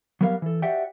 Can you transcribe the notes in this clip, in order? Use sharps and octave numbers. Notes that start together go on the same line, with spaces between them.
F#3 G3 B3 A#4 B4 F5
E3 A4
F#4 G4 D5 E5 F#5 G5